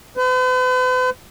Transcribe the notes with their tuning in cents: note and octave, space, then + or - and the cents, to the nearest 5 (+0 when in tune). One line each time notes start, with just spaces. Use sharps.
B4 +45